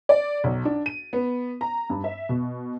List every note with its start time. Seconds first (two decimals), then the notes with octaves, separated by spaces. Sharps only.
0.09 D5
0.44 B1
0.65 D4
0.86 D#7
1.13 B3
1.61 A#5
1.90 G2
2.04 E5
2.29 B2